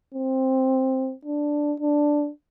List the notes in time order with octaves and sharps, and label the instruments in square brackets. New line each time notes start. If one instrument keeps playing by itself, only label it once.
[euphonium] C4
D4
D4